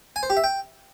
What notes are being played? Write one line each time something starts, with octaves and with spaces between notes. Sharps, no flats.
G#5
C5
G4
E5
G5